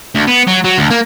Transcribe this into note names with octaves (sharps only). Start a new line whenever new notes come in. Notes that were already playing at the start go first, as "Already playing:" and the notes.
D2
B3
F#3
F#3
D2
A#3